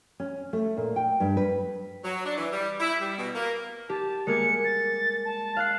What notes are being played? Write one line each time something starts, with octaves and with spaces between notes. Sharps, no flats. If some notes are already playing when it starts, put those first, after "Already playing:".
C#4
A3
A#2
G5
G2
B4
F#3
D4
E3
G3
E4
G3
B2
A#3
G4 A5
G#3 A#3 G#6 C#7
A6
A5
F5 F#6 C7